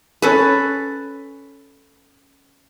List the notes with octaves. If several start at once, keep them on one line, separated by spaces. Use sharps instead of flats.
C#4 A4 B4